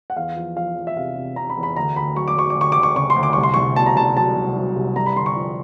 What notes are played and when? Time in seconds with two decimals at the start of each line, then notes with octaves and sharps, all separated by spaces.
0.10 F#5
0.16 E2 F5
0.36 F3
0.56 F3 F5
0.77 F3
0.87 E5
0.97 C3 F5
1.17 C3
1.36 C3 A#5
1.50 B5
1.57 E2
1.63 B5
1.76 D2 A#5
1.96 D2 B5
2.16 F#3 C#6
2.28 D6
2.36 F#3 C#6
2.50 D6
2.56 D2
2.61 C#6
2.72 D2 D6
2.83 C#6
2.96 C#3 C#6
3.10 C6
3.16 D2
3.23 D6
3.33 C2 C#6
3.43 C6
3.54 C2 C#6
3.76 B2 A5
3.86 A#5
3.96 C2 A5
4.17 F#3 A5
4.36 C2
4.56 F#3
4.76 C2
4.96 G2 A#5
5.06 B5
5.16 D3 C6
5.26 C#6
5.36 F3